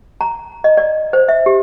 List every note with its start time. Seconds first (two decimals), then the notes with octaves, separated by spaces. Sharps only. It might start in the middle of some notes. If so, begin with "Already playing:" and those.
0.21 A#5
0.64 D#5
0.77 D5
1.13 C5
1.29 E5
1.46 G4